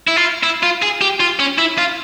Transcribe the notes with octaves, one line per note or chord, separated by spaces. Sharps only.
E4
F4
E4
F4
G#4
G4
F4
C#4
E4
F4